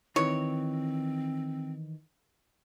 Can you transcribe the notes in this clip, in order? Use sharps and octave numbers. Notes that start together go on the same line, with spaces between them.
D#3 E3 C4 C#5